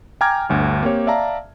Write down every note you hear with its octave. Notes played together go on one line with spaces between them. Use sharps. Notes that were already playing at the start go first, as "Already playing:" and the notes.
G5 G#5 A#5 D6 F6 G#6
G1 D2
A#3 C4 G4 C#5
D5 E5 F5 A5 A#5